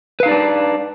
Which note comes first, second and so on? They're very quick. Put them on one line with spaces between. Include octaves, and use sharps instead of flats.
B4 F5 D#4 D5 D4